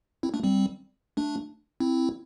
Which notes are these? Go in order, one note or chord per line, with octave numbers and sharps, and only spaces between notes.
C4 E4
A3 D4
G3 C4
A3 D4
C4 E4